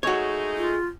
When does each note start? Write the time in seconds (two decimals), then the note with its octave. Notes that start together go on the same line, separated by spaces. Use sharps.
0.03 G#3 A3 D#4 F#4 G#4 C#5
0.57 F4